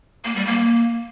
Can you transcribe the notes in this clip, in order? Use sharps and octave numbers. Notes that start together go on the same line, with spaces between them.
A#3
G3
A#3